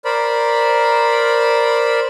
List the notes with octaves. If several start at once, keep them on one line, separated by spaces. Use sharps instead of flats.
A#4 C5 D5 B5